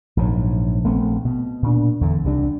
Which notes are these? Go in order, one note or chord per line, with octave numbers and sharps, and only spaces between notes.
A#1 G#2 C3 F#3
A#1 A3 B3 C4
B2
A#2 D4
E2 D3
C2 C3 D4